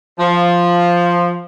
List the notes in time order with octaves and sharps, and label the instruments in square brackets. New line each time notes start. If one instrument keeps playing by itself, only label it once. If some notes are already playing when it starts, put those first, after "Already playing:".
[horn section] F3